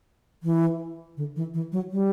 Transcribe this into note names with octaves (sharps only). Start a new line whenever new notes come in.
E3
D3
E3
E3
F#3
G3